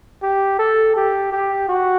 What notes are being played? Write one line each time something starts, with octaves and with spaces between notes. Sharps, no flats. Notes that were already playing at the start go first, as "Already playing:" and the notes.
G4
A4
G4
G4
F#4